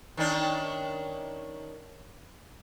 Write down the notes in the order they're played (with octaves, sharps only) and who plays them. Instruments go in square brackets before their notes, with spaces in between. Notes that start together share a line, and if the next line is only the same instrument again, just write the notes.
[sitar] D#3 C#4 D4